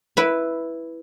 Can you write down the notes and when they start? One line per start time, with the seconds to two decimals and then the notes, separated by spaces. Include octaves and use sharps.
0.17 E4 B4